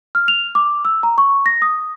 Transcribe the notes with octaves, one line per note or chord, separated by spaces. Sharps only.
F6
F7
D6
E6
A#5
C#6
A#6
D#6